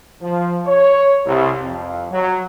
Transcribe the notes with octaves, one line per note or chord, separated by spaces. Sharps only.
F3
C#5
C2
F2
F#3